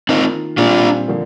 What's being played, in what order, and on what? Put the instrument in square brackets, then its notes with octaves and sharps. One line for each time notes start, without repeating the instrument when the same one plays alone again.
[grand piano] D#3 A#3 F4 [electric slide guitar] C4 D#4
[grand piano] A#2 G3 C4 [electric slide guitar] D4 F4
[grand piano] D3 F3 A#3